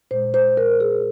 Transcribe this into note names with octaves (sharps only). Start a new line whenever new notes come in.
A#2 G#3 C5
C5
A#4
G#4